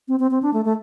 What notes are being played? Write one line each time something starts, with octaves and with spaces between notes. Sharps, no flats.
C4
C4
C4
D4
A3
A3